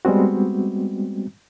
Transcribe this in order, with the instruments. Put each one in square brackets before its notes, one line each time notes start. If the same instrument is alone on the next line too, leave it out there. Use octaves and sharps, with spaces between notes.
[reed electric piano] G3 G#3 B3 C4 F#4